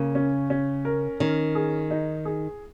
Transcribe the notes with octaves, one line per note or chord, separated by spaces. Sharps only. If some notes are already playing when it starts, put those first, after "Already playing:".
Already playing: C#3 A#3
C#4
C#4
A#4
D#3 C#4
G#4
D#4
G#4